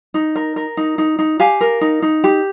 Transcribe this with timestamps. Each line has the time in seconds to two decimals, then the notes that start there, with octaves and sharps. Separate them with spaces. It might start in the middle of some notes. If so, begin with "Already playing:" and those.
0.14 D#4
0.35 A#4
0.56 A#4
0.77 D#4
0.98 D#4
1.19 D#4
1.40 G4 F5 G#5
1.61 A#4
1.81 D#4
2.02 D#4
2.24 G4